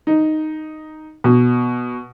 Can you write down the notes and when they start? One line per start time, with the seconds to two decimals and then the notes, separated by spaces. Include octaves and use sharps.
0.07 D#4
1.24 B2